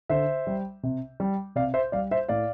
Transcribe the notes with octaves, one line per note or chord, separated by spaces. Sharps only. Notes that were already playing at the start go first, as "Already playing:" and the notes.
D3 C5 E5
G3
C3
G3
C3 D5 F5
C5 E5
G3 D5 F5
C5 E5
A2 D5 F5